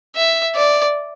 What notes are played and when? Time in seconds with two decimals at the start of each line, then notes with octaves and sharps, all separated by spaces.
0.16 E5
0.55 D5